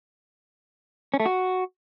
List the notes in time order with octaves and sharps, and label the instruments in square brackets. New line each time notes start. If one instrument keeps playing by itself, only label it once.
[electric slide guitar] C#4
A3
F#4